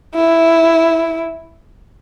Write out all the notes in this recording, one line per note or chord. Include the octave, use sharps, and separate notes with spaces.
E4